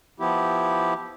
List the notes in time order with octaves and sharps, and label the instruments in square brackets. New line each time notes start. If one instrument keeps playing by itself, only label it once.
[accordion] F3 B3 E4 G4